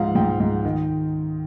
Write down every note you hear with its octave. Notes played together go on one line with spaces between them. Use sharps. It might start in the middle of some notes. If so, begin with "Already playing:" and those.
Already playing: G#2 F3 F5 F#5
G#2 G5
G#2
D#3